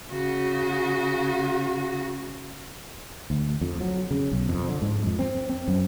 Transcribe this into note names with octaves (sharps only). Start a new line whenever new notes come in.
C#3 F#4
D2
F2
F#3
C#3
B1
F2
D3
G#2
F2
C4
C4
F#2